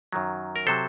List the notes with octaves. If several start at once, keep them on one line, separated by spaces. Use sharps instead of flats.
F#2 D#3 F#3
A#4
C3 F#3 A4 C5